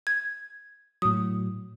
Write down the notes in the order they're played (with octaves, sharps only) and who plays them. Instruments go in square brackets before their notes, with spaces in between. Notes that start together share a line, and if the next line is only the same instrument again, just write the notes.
[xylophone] G#6
[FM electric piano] A2 F#3 [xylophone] D#6